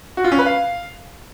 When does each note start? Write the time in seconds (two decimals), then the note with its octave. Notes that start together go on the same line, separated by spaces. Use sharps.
0.17 F#4
0.24 F4
0.32 C#4
0.39 B4
0.46 F5